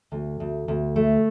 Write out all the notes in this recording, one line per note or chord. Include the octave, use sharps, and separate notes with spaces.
D2
D2
D2
A3